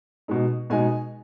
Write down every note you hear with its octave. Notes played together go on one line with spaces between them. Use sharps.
B2 G#3 D#4
B2 G#3 D#4 G#5